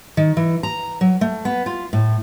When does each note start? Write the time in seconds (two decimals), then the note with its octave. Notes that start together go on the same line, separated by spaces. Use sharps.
0.17 D#3
0.37 E3
0.63 A#5
1.01 F#3
1.21 A3
1.45 B3
1.66 F4
1.93 A2